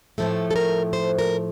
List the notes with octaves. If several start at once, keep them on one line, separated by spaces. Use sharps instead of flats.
A2 F3 A3 A4
A4
A#4
C5
A#4